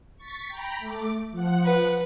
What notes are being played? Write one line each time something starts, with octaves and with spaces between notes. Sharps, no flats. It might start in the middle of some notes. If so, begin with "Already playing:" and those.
C#6 A6 B6
G5 A#5 B5
A3 D6
F3 F#5
B4